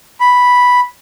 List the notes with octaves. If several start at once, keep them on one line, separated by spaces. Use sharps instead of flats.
B5